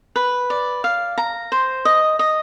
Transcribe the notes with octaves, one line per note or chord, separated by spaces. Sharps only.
B4
D5
F5
A#5
C5
D#5
D#5